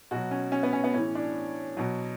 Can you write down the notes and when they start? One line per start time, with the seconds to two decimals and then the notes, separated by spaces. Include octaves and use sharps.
0.11 B2 F#3 F#4
0.31 C#4
0.52 C#4
0.63 B3
0.73 C#4
0.84 B3
0.94 A2 E3 C#4
1.15 D4
1.77 B2 F#3